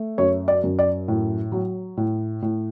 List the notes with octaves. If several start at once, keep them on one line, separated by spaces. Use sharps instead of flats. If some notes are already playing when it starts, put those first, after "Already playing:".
Already playing: A3
F#2 C#5
D5
F#2
D5
A2
F#3
A2
A2